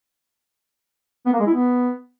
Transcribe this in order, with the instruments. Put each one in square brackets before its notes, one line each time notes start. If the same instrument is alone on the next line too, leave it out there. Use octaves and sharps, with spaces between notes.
[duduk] B3
A#3
G#3
E4
B3